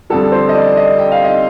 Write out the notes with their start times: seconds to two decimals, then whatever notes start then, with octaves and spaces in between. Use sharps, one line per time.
0.10 F2 D3 G3 A4
0.32 C5
0.49 D#5
0.55 D5
0.77 D#5
0.99 G5
1.12 F5
1.24 D#5